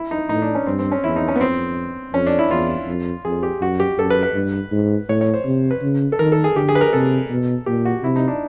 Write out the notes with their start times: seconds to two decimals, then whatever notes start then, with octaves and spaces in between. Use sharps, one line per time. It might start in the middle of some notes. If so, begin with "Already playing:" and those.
Already playing: E4
0.11 D#4
0.29 A2 D#4
0.42 D4
0.55 C#4
0.67 G2 C4
0.79 C4
0.92 C#4
1.04 E2 E4
1.16 D#4
1.28 C#4
1.36 B3
1.41 F2 C4
2.14 F2 C#4
2.27 D4
2.39 E4
2.50 E2 F4
2.87 F2
3.25 F2 G#4
3.43 G4
3.61 F#2 F#4
3.80 G4
3.98 F#2 A4
4.10 B4
4.23 B4
4.35 G2
4.71 G#2
5.09 A2 C#5
5.21 C#5
5.34 C5
5.45 C3
5.71 B4
5.82 C#3
6.12 A4
6.19 D#3 A#4
6.32 A4
6.44 G#4
6.56 D3 G4
6.69 G#4
6.75 B4
6.81 A#4
6.93 C3 A4
7.30 B2
7.66 A#2 G4
7.85 F#4
8.03 C3 E4
8.16 D#4
8.28 D4